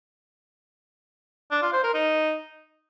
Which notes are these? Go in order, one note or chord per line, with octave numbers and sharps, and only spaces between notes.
D4
F4
C5
A#4
D#4